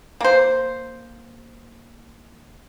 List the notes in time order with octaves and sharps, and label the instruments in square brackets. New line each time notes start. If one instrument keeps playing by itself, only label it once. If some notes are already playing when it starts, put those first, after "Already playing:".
[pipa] A#3 C5